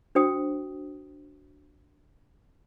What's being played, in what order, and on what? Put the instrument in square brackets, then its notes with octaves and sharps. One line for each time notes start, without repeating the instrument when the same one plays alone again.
[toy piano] D4 F#4 C5 G5 D#6